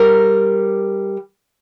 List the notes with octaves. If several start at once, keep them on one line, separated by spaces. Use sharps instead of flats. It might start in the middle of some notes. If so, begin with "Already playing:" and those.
Already playing: G3 A#4